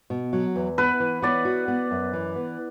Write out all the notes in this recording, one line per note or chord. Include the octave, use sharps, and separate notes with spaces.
B2
F#3
E2
B3 B4
E3
B3 D5
F#4
B3
F#2
E3
B3